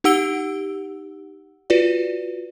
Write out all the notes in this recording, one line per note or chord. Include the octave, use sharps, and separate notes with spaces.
D#4 G4 F#5 E6 D7 G7
F4 F#4 B4 D5